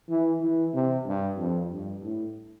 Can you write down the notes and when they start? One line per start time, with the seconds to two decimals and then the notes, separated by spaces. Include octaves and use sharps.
0.09 E3
0.42 E3
0.74 C3
1.07 G2
1.38 F2
1.72 G2
2.03 A2